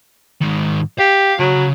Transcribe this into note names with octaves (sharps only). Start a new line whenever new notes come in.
G#2 D#3
G4 F5
C#3 F#3